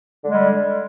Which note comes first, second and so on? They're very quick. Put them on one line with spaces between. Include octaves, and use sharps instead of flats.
D3 G#3 G3